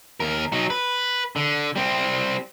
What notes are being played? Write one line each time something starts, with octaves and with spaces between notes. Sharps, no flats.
D#2 A#4
F#3 D#4
B4
D3
G3 C4